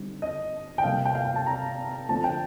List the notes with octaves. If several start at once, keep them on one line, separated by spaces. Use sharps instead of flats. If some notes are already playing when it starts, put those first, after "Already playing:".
Already playing: D3 G3 C4 D#4
D#5
G5
C3 G3 A#3 F5
G5
F5
G5
A5
A#5
D3 F3 A3 C4 A5
G5